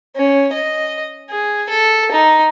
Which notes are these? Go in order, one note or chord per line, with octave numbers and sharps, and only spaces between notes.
C#4
D#5
G#4
A4
D#4